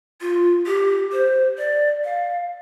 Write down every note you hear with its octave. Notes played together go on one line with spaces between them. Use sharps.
F4
G4
C5
D5
F5